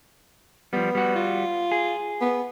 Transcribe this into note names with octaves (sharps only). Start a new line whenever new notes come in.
F3 G3 B3
G3 F#4
F4
G#4
B3